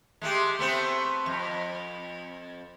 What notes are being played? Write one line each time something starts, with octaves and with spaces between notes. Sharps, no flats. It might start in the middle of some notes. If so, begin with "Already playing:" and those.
G#3 A3 G4
A3 B3 C4
F2